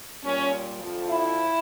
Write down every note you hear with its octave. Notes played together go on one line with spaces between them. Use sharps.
A#2 G3 C#4
F2 D3 F3
E4